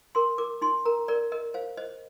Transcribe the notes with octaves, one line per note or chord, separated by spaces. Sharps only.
A#4 C6
A#4 D6
D#4 C6
A#4 A#5
A#4 D5
A#4 D#5
C5 F5
C5 D#5